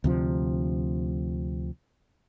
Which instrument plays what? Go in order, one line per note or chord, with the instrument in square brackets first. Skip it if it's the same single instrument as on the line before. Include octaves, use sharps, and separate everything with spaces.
[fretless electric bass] D2 C3 F3